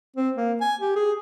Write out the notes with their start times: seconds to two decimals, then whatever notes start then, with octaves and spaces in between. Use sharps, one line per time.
0.17 C4
0.37 A#3
0.61 G#5
0.81 G4
0.96 G#4